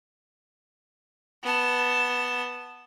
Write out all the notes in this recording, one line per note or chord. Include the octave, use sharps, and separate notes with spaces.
B3 A5